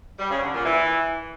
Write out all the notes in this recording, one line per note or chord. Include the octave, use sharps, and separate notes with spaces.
G3
C#3
D3
A#2
E3